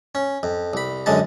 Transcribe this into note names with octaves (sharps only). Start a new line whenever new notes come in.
C#4
F2
C2 B5
F#2 D3 G#3 A5